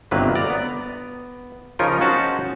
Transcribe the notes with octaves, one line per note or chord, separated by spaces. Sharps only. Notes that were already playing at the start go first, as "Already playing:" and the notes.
G1 C3 D#3 F#3 A#3 B4
D5 A#5
B3
C#3 F3 C#4 D#4 F4 A#4
C#4 D#4 F#4 C5 A5